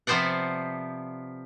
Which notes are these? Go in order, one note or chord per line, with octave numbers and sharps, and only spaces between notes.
C3 F3 B3 C5 D5 F#5